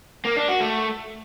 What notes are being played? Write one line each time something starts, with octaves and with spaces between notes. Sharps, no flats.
A#3
D4
F#4
A3